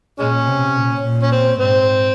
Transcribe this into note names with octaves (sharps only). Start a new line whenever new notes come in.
A#2 G#3 C#4
C3
A#2
A#2
C#4
C4
G#2 C4